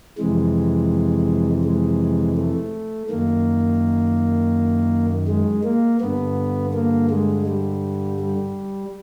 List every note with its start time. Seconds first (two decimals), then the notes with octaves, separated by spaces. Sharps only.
0.18 F2 C3 E3 G#3
1.64 G#3
2.37 A3
3.10 F#2 D#3 A#3
5.28 G#3
5.64 A#3
6.01 G2 D3 B3
6.74 A#3
7.10 G#3
7.47 G3
8.19 G3